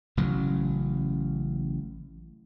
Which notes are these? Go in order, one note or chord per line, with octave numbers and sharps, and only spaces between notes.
A1 C#3 F#3